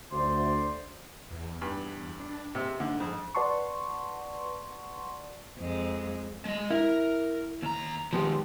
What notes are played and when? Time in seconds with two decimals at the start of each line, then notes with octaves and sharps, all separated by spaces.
0.11 D2 C5 D5 C6
1.31 E2
1.62 G2
2.20 D4
2.55 G#2 C3
2.80 D3
3.00 F2
3.35 B4 D5 F#5 A5 C6 C#6
5.59 F2 G#3
6.45 G#3 D#5
6.70 E4 A#4
7.62 D#2 A#5
8.13 D#3 F3 G#3 B3 G4